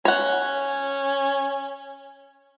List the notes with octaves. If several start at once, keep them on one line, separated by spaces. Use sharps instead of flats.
C#4 C#5 F#5